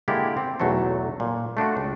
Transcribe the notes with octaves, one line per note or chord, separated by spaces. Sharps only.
D3 G#3 A#3 E4 G4 D5
C4
B1 E2 F#3 A3 A4
A#2
A3 D4 F4 F#4
C#2